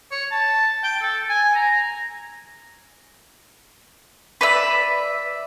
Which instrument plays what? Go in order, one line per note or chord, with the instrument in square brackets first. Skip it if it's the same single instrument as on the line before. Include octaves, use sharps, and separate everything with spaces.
[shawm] C#5
A5
G5
A4
G#5
A#5
[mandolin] B4 D5 E5